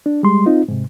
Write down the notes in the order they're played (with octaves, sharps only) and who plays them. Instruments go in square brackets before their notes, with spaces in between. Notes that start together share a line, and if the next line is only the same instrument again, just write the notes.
[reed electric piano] D4
G3 G#3 C6
C4 D#4 F4
G#2 C3